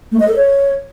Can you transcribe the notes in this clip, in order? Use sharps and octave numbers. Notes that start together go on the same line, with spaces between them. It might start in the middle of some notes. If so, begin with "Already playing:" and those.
A3
D#5
A4
C#5